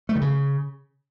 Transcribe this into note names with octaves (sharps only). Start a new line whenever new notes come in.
A3
D#3
C#3